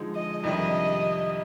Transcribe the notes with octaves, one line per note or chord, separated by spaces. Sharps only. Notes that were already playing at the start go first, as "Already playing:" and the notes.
Already playing: D3 F3 G#3 D#4 G#4
D#5
F2 C3 D#3 G3 D4 D#5